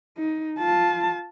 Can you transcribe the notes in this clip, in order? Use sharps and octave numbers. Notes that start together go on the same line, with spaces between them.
D#4
F4 A5